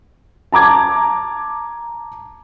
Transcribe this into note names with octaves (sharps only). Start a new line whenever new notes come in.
A5 A#5 D6 G#6